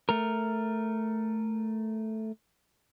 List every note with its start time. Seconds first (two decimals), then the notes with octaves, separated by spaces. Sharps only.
0.09 A3 A#4